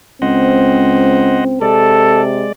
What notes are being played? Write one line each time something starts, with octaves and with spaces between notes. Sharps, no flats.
C#2 C4 C5 D#5 F#5
C3 G#3 A4 D5